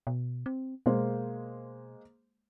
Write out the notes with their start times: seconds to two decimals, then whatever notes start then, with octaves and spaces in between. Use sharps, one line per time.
0.07 B2
0.46 C4
0.86 B2 G#3 A#3 C5